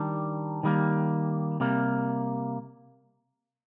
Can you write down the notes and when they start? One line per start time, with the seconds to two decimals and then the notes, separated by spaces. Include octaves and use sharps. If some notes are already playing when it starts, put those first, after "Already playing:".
Already playing: D#3 G3 D4
0.63 D#3 G3 A#3
1.60 C3 G3 A#3